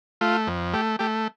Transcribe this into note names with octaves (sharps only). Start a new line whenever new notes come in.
A3 F4
F2
A3 G4
A3 G4